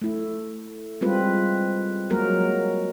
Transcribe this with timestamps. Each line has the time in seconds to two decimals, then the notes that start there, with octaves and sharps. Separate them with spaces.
0.01 A3 E4
1.01 G3 G#3 C4 F4 B4
2.10 F#3 G#3 A#3 F#4 A#4